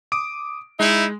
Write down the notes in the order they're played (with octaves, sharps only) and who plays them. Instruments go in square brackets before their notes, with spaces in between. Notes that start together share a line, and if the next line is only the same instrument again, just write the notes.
[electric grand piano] D6 D#6 D7
[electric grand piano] G#3 [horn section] D#4 E4